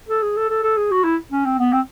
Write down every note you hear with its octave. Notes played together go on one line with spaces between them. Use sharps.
A4
G#4
A4
A4
A4
G#4
F#4
E4
C#4
C4
B3
C4